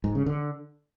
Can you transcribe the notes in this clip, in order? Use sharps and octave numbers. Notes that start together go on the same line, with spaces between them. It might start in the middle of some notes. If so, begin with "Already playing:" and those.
G#2
C#3
D3